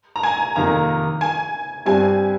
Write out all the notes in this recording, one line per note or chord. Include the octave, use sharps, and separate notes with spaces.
A#5
G#5
F2 C3 D#3 A#3 A#5
G#5
G2 G3 C4 G4 G#5